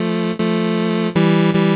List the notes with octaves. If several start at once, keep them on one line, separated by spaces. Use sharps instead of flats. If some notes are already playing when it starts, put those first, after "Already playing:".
Already playing: F3 A3
F3 A3
E3 G3
E3 G3